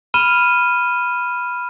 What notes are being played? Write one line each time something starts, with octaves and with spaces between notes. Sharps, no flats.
B5 F6 D#7 E7 G7